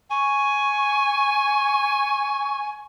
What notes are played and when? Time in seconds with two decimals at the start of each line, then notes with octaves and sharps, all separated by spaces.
0.10 G#5 C#6